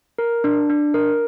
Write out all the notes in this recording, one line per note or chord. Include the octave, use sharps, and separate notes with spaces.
A#4
D4
D4
A#4